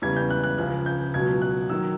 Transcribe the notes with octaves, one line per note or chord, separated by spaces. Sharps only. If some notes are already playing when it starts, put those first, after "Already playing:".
E2 C#3 E3 G3 G#6
G6
F#6
F#6
C#2 C#3 F3 F#6
G6
C#2 B2 F#3 G#6
F#6
D#3 F#3 E6